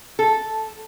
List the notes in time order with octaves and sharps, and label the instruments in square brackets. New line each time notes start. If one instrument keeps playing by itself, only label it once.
[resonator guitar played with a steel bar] A4